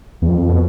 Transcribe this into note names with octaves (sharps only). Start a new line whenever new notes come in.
E2
F2
B2